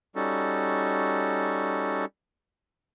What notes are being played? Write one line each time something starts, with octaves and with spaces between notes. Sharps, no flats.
G3 C#4 D#4 F#4 A4